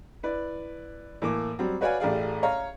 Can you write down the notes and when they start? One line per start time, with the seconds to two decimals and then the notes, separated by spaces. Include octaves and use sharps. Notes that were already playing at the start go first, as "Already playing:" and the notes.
0.23 E4 B4 D5
1.22 A2 E3 A#3 D6
1.59 F#3 G3 C4
1.81 F#4 B4 C#5 D5 F5 G#5
2.00 A1 A3 G4 G#4 D5 F5
2.43 C#5 F5 A#5